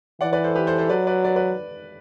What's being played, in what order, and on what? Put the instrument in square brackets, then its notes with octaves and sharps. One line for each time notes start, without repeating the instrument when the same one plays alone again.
[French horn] E3 [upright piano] D5 F#5
[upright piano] B4 D5
A4 C5
G4 B4
A4 C5
A4 C5
[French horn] F#3 [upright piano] B4 D5
[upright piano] B4 D5
B4 D5
B4 D5